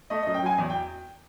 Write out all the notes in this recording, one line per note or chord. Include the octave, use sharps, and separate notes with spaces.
A3 D#5
F#2 D#5
G5
F#3 G#5
E2
G5